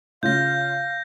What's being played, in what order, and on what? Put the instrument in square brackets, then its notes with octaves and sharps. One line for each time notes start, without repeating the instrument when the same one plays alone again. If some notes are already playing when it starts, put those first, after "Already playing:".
[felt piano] C#3 F4 [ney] F5 [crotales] G6 A#6